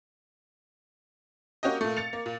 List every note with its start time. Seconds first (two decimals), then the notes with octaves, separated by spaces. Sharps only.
1.63 A#3 C#4 F#4 G4 D#5
1.81 A#2 A3
1.97 A6 C#7 F7
2.13 A#3
2.26 A#2